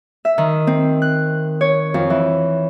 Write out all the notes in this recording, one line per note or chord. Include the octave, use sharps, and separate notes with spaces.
E5
D#3
C4
F#6
C#5
F2
E3